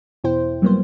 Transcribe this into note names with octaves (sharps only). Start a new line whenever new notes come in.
E2 B2 E4 C5 G5
F#3 G3 A#3 B3 C5